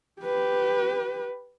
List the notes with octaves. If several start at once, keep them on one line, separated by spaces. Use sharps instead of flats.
G4 B4